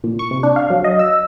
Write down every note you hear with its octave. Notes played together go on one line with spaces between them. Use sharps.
A#2
C#6
C3
D4
F5
F#3
D#5
E6